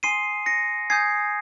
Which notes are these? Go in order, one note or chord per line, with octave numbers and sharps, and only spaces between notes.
G#5 C6 D#6 C7 D#7
A#6 C#7
G#5 D#6 G6 G#6 C7